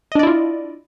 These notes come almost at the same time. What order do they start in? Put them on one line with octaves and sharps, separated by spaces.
D#5 D4 D5 E4 F4